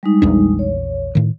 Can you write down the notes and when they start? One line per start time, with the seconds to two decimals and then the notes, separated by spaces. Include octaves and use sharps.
0.03 G3 G#3 D#4
0.22 A#1 E2 D4
0.59 C#5
1.15 A2 D#3